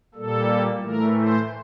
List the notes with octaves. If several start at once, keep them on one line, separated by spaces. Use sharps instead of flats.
A#2 G3 A#3 A4
A2 E3 A3 A#4
C5